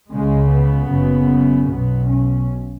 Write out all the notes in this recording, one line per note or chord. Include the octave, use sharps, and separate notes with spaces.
C#2 C#3 G#3
B3
F#1 F#2 C#3
B1 B2 B3
C#4